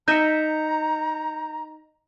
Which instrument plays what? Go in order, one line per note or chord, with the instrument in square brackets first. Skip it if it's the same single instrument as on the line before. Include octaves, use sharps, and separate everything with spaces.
[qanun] D#4 D#5 E5 [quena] A#5 [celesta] G6 C#7